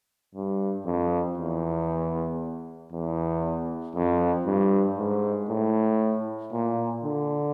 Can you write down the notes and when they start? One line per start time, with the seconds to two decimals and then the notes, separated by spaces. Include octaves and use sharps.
0.35 G2
0.86 F2
1.38 E2
2.93 E2
3.96 F2
4.47 G2
4.98 G#2
5.49 A2
6.53 A#2
7.04 D3